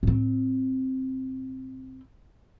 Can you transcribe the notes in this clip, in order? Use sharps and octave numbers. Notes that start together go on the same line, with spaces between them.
A2 C4